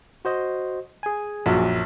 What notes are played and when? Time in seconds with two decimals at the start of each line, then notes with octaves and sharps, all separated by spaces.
0.25 F#4 C5 D#5
1.03 G#4 G#5
1.46 A#1 F#2